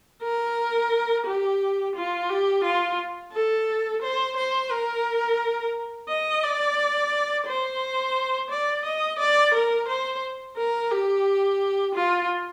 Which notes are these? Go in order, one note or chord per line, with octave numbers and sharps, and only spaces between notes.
A#4
G4
F4
G4
F4
A4
C5
C5
A#4
D#5
D5
C5
D5
D#5
D5
A#4
C5
A#4
G4
F4